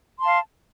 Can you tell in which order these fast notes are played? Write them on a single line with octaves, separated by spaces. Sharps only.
C6 A5 F5